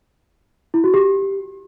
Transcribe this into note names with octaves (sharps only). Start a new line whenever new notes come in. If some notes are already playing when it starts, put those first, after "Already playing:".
E4
F#4
G4